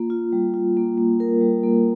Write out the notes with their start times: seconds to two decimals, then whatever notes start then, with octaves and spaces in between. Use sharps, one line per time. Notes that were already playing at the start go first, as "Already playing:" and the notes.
Already playing: A#3 F4
0.10 F4
0.33 G3
0.54 F4
0.77 A#3
0.98 A#3
1.20 A#4
1.41 G3
1.63 A#3